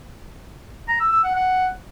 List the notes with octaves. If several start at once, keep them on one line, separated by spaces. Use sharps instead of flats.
A#5
E6
E6
F#5
F#5